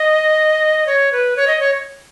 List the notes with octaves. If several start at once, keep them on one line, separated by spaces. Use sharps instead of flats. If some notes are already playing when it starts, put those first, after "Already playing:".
Already playing: D#5
C#5
B4
C#5
D#5
C#5